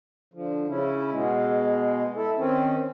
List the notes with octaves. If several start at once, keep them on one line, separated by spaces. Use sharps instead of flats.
D3 F3
C#3 C#4 E4
B2 G#3
E4 A4
D#3 C4 C#4